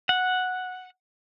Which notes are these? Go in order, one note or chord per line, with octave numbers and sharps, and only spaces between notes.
F#5